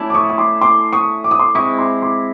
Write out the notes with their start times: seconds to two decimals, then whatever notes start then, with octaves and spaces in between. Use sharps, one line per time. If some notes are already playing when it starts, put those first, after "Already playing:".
Already playing: A3 C#4 E4 A4 D5
0.10 D6
0.14 C#6 D#6
0.29 D#6
0.38 C6 D6
0.61 C6 D6
0.93 C#6 D#6
1.24 D6
1.31 D#6
1.39 C6 D6
1.55 G#3 C4 E4 C#6 D#6
1.79 C6 D6
2.02 C6 D6